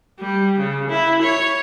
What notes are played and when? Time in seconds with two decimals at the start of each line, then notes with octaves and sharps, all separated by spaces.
0.19 G3
0.58 C#3
0.89 E4
1.21 C#5